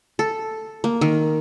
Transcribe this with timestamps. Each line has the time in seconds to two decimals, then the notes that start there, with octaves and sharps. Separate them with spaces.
0.19 A4
0.84 A#3
1.01 D#3